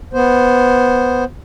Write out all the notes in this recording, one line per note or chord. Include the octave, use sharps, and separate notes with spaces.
B3 C5